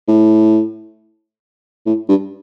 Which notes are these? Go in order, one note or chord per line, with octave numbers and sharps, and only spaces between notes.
A2
A2
G2